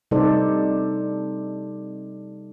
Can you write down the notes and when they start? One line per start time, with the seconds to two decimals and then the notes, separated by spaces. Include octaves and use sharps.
0.11 C3 G3 D#4 A4 C5 D5